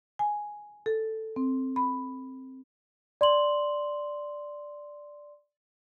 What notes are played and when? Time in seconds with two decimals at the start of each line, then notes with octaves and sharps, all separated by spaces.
0.19 G#5
0.86 A4
1.36 C4
1.76 B5
3.21 D5 C6 F#7